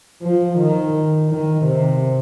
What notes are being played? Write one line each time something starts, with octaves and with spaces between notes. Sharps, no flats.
F3
D#3
D#3
C3